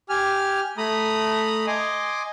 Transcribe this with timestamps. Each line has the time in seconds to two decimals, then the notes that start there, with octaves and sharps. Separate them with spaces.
0.09 G4 G#5 F6
0.78 A3 A#5 B5 D#6
1.67 D#5 G#5 C6 D6